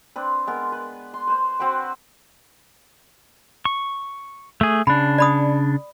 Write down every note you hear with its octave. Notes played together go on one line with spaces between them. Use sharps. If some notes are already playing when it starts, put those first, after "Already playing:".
C4 D4 B4
G#3 B3 A#4
B4
C6
B4 C5 C6
C4 F#4 B4 G5
C#6
A3 G#4
C#3 D4 B5
D5 B5 D#6